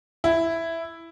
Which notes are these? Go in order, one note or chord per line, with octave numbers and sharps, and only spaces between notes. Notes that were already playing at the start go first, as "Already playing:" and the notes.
E4